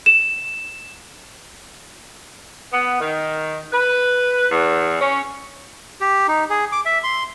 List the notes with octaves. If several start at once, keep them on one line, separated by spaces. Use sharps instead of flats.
E7
B3
D#3
B4
E2
C#4
G4
D#4
G#4
D6
E5
C6